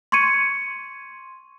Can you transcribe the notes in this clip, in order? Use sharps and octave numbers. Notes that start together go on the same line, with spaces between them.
C6 C#6 G#6 C#7 D#7